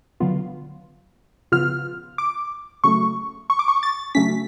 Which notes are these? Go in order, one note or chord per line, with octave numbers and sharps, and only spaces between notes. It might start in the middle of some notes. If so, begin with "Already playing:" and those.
D3 F#3 B3 F4
C#3 F3 B3 F4 F6
D6
C#3 F#3 A3 C#6
C#6
D6
C#6
A6
C#3 F#3 A3 C#4 B6